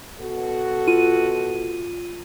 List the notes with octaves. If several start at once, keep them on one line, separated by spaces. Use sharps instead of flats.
B2 F#4 A4
F4 D#7